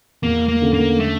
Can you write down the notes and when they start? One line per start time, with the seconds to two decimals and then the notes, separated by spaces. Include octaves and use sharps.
0.23 E2 A#3
0.48 A#3
0.61 D3 A3 C#4
0.74 A#3
1.00 A3